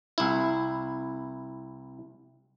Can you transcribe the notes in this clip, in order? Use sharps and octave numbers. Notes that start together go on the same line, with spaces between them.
C2 E4